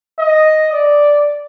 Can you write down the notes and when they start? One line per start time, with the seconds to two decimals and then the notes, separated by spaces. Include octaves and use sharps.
0.19 D#5
0.73 D5